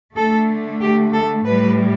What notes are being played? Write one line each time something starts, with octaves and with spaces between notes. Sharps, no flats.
D3 A3 A4
G4
A4
A2 G3 B4